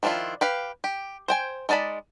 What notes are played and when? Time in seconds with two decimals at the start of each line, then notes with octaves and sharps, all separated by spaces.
0.03 D#3 F3 D4 E4 F4
0.41 G4 B4 F5
0.84 G4
1.28 C5 G5 G#5
1.69 G#3 D#4 D5 A5 B5